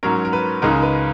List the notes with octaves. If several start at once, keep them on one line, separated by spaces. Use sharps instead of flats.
G#2 F#3 C#4 A#4
A#4
B4
C#2 C#3 G#3 D#4 A#4
B4